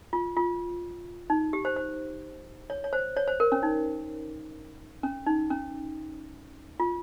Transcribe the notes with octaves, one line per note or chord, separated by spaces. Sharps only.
F4
F4
D#4
G4
C5
C5
C#5
C#5
C5
C#5
C5
A#4
C#4
D#4
C#4
D#4
C#4
F4